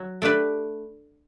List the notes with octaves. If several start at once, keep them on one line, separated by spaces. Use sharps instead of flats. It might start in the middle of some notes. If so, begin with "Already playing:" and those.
Already playing: F#3
A3 D4 G4 B4